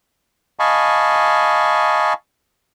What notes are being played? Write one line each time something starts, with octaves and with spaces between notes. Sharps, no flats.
D#5 F5 G#5 A5 B5 C#6